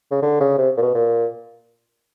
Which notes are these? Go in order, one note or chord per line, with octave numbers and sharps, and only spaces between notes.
C#3
D3
C#3
C3
A#2
B2
A#2